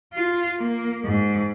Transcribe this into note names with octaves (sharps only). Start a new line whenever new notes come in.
F4
A#3
G#2